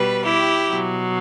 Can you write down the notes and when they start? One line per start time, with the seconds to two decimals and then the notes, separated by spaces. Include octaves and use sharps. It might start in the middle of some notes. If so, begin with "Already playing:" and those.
Already playing: B2 G3 B4
0.24 E4 G4
0.70 B2 F#3